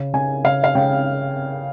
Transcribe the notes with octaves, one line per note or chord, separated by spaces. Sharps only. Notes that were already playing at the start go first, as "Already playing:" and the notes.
Already playing: C#3
C#3 G#5
C#3 F5
F5
C#3 G5